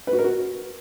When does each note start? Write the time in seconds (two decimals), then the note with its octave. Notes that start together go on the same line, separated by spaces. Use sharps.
0.07 B4
0.13 F#4
0.19 A#4
0.24 F#4